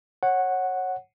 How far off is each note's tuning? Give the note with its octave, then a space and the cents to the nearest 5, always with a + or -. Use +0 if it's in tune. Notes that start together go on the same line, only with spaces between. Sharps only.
C#5 -20 F#5 +0